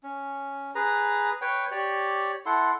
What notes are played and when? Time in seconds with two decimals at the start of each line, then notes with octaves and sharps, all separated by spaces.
0.03 C#4
0.75 G#4 B4 A#5
1.42 B4 C#5 G5
1.71 G4 C#5 D5
2.46 E4 A4 F#5 C6